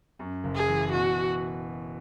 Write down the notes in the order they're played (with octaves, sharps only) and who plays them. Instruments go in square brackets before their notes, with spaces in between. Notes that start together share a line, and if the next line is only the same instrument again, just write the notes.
[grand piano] F#2
F#1
[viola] G#4
[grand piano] E3
[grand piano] B2 [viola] F#4